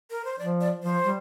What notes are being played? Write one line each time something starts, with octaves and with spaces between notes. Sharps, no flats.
A#4
C5
F3 D5
D5
F3 C5
G3